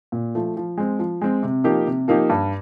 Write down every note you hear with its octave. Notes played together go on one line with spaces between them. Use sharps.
A#2
F3 A3
F3
G#3 C4
F3
G#3 C4
C3
F3 A#3 D#4 G4
C3
F3 A#3 D#4 G4
G2